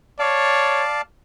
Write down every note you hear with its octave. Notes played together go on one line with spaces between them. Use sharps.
C#5 D5 F5 A5